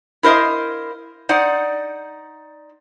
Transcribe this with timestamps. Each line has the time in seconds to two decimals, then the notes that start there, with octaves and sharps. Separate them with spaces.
0.23 E4 A#4 C5 D#5 F5
1.29 D#4 C5 D5 F#5